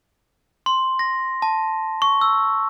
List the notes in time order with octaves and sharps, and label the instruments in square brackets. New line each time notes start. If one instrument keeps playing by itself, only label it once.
[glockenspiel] C6
A#6
A5
C#6
E6